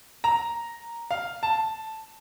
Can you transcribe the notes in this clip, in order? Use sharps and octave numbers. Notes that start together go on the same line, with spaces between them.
A#5
F5
A5